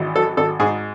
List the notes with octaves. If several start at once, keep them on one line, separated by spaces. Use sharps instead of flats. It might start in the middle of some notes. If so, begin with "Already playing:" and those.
Already playing: G#1 E3
F#3 A4
G#1 A4
G#2 G#4